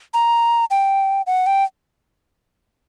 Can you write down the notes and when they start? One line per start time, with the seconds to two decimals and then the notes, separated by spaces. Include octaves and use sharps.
0.14 A#5
0.71 G5
1.27 F#5
1.46 G5